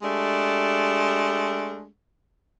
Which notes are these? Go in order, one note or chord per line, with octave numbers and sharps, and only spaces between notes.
G#3 A3 D4 G4